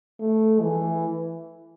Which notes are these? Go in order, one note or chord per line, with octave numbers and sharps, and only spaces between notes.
A3
E3